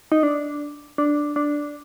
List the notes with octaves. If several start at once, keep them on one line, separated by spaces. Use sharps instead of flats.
D#4
D4
D4
D4